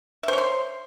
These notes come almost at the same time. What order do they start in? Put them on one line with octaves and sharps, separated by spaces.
E5 C5 C#5 C6